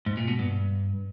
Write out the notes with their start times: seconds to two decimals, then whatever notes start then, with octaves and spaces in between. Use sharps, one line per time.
0.06 G#2
0.17 A#2
0.28 B2
0.39 G2